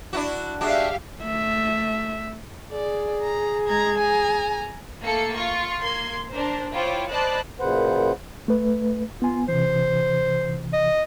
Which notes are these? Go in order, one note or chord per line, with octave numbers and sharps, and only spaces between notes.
D4 E4 F#4
G#3 D4 F#4 G4 E5 F5
A3 E5
G#4 D5
A#5
G#3 A#5 G#6
G#5 A#5
A3 A#3 A4 C#7
F4 C#6
A#3 C6 G#6
D4 A#4 C5
E4 F4 C5 C#5 G5 D6
C5 D5 D#5 A5 B5 F#6
F#2 A#2 C#3 B4 C5 F#5
A3 B4
B3 F4 G#5
C3 E3 C5
D#5